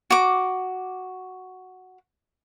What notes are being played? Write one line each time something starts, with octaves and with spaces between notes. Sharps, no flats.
F#4 D6